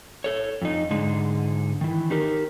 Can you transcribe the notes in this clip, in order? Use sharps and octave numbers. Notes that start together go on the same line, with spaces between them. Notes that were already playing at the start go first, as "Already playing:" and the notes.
A4 C#5
F2 D#4
G#2 D3 G#3 D#4
D#3 E3
D#4 G4 A#4